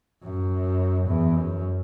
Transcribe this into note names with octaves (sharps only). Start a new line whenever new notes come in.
F#2
E2
F#2